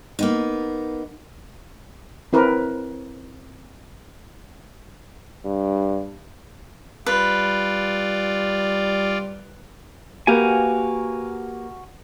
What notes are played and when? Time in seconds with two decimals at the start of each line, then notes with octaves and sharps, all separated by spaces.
0.19 A#3 B3 D#4
2.33 C4 E4 A#4 B4
5.45 G2
7.06 G3 F4 B4 D5
10.27 A#3 F#4 G4 B4 F5 G#5